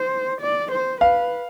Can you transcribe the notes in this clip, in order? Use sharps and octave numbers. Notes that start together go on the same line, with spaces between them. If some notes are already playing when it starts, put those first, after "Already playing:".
Already playing: C5
D5
C5
B4 F5